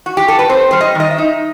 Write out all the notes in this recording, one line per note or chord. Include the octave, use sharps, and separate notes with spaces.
F#4
G4
A4
B4
C4 C5
G3 C5
D#5
D#3 D#5
E5
D#4